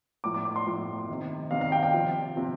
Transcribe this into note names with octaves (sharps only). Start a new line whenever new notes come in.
A2 F3 D6
D6
D6
C6
A2 F3
C3 D#3
C3 D#3 F5
F5
G5
G5
C3 F3
C3 F3